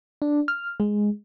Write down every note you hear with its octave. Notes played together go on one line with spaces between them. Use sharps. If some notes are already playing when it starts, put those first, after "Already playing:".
D4
F6
G#3